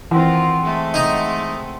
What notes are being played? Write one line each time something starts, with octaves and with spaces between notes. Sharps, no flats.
D#3 E3 C4 F4 F#5
G#3 A3 A4
D#4